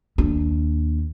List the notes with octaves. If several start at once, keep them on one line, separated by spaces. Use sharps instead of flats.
D#2 D4